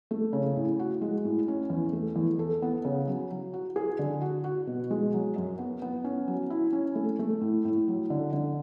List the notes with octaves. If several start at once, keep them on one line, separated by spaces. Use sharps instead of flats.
A3
C#3
A2
F#4
G#3
A2
C#4
E2
A3
E2
A4
B3
C#3
F#3
F#3
F#4
G#4
D3
F#4
F#4
B2
G#3
F#3
F#2
B3
B3
C#4
F#3
E4
C#4
A3
A3
A2
A2
F#3
D3
D3